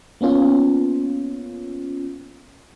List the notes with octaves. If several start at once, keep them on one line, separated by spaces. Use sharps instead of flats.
A#3 B3 C#4 F4